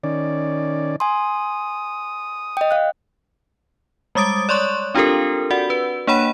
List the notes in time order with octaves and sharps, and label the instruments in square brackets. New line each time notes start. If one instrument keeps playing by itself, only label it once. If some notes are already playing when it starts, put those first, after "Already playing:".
[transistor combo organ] D#3 C#4 D5
[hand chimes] G#5 C6 [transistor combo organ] D#6
[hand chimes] D#5 G5
F5 F#6
[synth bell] G3 G#3 D6 D#6 A6 D7
C#5 D5 C6 C#6 F#6
C4 D4 F4 G4 A4 A#4
F#4 D5 F#5
B4
A#3 D4 C#5 F#5 B5 D#7